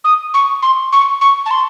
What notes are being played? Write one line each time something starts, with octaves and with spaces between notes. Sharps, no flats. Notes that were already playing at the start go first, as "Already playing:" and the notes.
D#6
C#6
C6
C#6
C#6
A5
C6